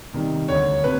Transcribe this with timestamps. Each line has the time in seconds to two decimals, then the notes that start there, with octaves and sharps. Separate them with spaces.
0.13 C3 D#3 G3
0.48 D2 C#5
0.84 C3 B4